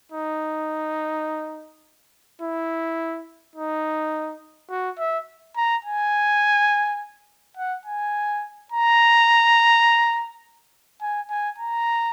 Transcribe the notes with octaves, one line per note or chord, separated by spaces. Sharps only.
D#4
E4
D#4
F#4
E5
A#5
G#5
F#5
G#5
A#5
G#5
G#5
A#5